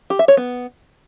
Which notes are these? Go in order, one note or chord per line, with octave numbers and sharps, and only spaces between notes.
G4
E5
C#5
B3